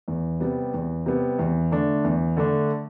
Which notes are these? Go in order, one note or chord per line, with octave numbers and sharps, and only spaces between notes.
E2
C3 G3 B3
E2
C3 G3 B3
E2
D3 A3 D4
E2
D3 A3 D4